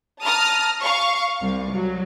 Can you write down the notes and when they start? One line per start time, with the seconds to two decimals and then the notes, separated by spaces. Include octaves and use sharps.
0.22 A5 A#5 D#6 F6
0.82 F5 C#6
1.41 C2
1.72 F#3